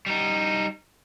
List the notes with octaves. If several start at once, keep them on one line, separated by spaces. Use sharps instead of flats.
G3 D#4